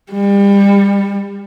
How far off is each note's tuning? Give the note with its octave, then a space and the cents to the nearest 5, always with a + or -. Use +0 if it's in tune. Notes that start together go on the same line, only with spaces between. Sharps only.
G3 +30